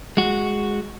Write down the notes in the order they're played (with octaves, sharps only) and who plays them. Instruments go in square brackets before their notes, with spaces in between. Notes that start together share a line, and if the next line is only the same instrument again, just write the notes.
[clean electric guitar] G#3 F#4